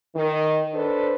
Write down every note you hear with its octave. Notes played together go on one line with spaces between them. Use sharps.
D#3
D4 A4 B4 C5